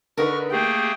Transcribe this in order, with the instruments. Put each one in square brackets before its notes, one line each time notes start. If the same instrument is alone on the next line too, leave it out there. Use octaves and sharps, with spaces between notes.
[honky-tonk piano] D3 D#4 B4 [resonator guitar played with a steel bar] A#4 [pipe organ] C#6 F6
[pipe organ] A3 A#3 G#4 [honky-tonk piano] G4 [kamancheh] G5